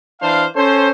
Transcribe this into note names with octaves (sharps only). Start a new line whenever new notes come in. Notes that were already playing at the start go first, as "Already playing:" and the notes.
E3 D4 C5 F5
C#4 A4 C5